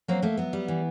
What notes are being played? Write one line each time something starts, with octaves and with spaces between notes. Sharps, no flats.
F#3 A#3 C4
A3 A#3
F#3 B3
G3
E3